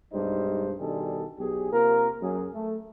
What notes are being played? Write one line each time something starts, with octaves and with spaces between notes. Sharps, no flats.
B1 G2 G3 G#3 D#4 C5
B2 D#3 G3 D4 G#4 A4
B1 G4 G#4
C3 A#3 F4 A#4
F#2 G#4
A3